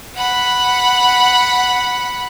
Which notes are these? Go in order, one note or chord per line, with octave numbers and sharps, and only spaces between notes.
F#5 B5